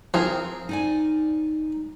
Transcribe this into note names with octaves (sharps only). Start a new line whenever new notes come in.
F3 C4 G#4 A#4
D#4 D5 G#5